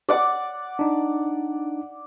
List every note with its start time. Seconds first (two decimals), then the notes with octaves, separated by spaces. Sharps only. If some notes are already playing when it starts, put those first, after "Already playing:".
0.09 D5 F#5 D6
0.79 D4 D#4